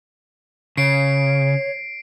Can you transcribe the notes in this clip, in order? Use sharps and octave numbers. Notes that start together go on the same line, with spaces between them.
C#3 C#5 C7 D7